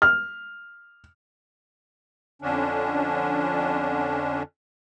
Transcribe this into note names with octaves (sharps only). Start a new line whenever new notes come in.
F6
F2 D3 C#4 D4